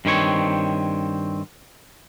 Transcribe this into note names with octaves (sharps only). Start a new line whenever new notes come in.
G2 D#3 C4 C#5